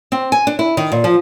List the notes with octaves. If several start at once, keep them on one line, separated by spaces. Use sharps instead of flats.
C4
G#5
D4
E4
D#3
A#2
F3